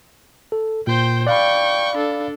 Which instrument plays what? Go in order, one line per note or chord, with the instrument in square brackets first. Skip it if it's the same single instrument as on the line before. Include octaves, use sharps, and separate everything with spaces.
[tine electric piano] A4
[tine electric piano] A#2 [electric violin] C5 G5
[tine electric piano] D5 F5 B5 [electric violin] G5 C#6
[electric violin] D4 A4